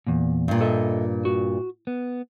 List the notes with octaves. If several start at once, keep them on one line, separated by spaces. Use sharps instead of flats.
E2 A#2
G2 A#2
A4 D#5 E5
F#4
B3